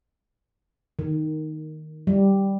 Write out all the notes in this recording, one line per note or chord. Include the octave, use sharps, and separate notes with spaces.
D#3
G3